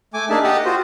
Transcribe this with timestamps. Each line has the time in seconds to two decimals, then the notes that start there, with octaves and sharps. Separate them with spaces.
0.14 A3 G#5 D6
0.30 A#3 D4 D#4 G#4 E5 A5
0.44 G4 D#5 F#5 G5 A5
0.65 F4 F#4 C5